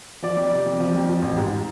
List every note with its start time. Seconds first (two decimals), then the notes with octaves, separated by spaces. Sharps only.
0.22 F3 D5
0.37 F2
0.51 C3
0.66 F2
0.80 F3
0.95 F2
1.08 F3
1.22 A1
1.37 G#2